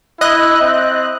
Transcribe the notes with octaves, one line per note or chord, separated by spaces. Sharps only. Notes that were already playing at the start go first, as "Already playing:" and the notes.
E4 D#5 F#6
C4